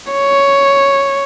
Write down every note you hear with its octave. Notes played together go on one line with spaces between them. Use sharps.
C#5